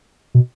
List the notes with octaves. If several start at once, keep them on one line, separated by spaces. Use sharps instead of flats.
B2